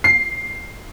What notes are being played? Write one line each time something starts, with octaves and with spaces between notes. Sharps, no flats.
C7